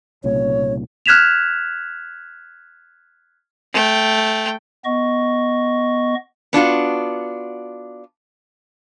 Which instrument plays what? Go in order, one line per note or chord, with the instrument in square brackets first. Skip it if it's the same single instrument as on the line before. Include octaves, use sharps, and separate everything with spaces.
[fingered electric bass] C2 A#2 C#3 [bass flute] C#5
[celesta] F6 F#6 G#6 B6 E7 F7
[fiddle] A3 G5
[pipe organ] B3 D#5 C#6
[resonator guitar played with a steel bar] B3 D4 F4 F#4